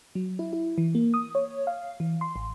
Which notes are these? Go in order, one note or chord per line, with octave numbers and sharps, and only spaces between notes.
F#3
E4
E4
E3
A#3
D#6
C#5
F5
E3
C6
A1